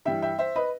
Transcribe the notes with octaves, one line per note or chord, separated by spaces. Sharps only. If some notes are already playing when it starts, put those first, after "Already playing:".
G2 E3 G3 E5 G5
E5 G5
C5 E5
B4 D#5